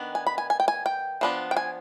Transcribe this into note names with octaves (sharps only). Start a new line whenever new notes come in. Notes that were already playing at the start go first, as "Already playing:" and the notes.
Already playing: D#3 B3 D4
G#5
B5
G#5
G#5
G5
G#5
G5
F3 B3 D4
G5
G#5